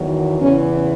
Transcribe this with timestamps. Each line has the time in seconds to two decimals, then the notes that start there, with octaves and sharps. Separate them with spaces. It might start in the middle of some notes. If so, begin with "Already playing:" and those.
Already playing: E2 D#3 F#3
0.41 E2 C#3 E3 C#4